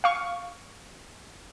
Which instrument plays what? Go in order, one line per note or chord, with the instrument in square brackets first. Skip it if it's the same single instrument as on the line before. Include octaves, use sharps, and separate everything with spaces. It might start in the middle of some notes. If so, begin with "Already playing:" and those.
[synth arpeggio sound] F5 C#6